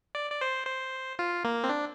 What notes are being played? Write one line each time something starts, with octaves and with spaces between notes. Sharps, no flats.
D5
D5
C5
C5
F4
A#3
C4
D4